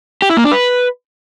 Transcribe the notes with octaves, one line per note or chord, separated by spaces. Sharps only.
G4
E4
A#3
D4
B4